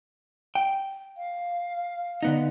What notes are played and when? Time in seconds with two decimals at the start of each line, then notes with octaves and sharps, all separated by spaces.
0.55 G5
1.17 F5
2.23 D3 B3 D#4